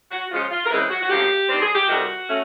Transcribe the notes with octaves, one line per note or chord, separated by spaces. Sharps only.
F#4
C#3 F3 G#3 C#4 F4
F4
A#4
C#3 E3 G#3 C4 B4
F#4
F#4
D2 C#3 F3 A#3 G4
G2 D#3 G3 C4
G#4
G4
F2 C3 D#3 G3 F#4
A3 C#4